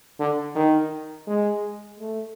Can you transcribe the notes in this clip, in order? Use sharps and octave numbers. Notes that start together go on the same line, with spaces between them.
D3
D#3
G#3
A3